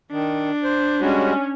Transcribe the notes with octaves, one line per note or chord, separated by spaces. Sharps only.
D#3 D4
C5
G3 G#3 C#4 F#4